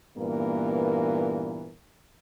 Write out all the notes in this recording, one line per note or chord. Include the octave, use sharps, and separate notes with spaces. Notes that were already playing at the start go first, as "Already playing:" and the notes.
G2 A#2 E3 A#3 B3 A#4